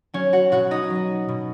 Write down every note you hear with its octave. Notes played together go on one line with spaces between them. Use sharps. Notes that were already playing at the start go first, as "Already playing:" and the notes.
F#3 C#4 C#5
F#4 F#5
B2 F#4 F#5
D#4 D#5
F#3
B2